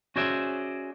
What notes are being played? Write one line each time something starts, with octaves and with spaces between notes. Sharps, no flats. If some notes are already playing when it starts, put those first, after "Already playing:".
C#4 F#4 G#4 C5 D5 E5